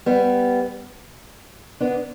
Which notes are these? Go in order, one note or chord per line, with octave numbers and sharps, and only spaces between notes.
G3 B3
B3 D4